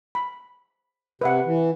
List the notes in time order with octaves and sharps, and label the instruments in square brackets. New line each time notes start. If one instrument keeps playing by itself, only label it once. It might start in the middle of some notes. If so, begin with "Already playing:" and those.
[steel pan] B5
[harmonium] C3 [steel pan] B4 E5 F#5
[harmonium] E3